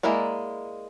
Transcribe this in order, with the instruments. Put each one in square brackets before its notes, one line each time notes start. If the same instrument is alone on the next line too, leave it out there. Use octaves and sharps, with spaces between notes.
[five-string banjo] G#3 A#3 E4 A#4 D5